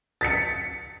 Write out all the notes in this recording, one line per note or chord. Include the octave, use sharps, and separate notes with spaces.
A6 B6 C#7